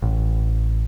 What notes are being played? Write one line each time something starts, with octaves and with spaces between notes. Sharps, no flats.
A1